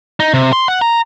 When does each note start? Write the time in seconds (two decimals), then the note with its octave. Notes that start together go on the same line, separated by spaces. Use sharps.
0.20 D#4
0.34 C3
0.53 C6
0.68 F#5
0.82 A#5